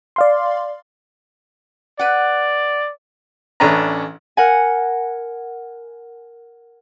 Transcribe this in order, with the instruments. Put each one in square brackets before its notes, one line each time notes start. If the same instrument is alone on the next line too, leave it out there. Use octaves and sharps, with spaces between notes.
[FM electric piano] D5 F5 C6
[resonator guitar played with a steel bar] B4 F#5 [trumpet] D5
[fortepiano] A1 A3 C#4 D4 B4 A#5
[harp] A#4 F#5 G#5